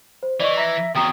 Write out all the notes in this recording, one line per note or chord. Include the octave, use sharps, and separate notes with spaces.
C5
E3 D5 D#5 C#6
E5 A#5 A#6 B6
E2 F#3 G5 A#5 D#6 G7